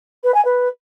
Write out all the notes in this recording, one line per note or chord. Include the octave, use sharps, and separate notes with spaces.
B4
G#5
B4